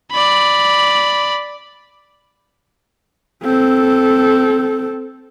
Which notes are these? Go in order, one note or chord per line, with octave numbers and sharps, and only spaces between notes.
D5 B5
C4 A4